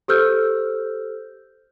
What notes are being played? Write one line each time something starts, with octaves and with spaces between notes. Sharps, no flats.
G4 A4 C5 E6 F6 G6